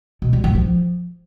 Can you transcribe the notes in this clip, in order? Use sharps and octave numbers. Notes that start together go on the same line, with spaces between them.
B2
G3
G2
F3